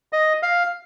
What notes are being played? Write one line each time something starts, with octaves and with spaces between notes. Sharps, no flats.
D#5
F5